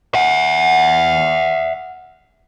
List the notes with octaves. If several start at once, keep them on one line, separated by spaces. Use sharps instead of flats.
E5 F#5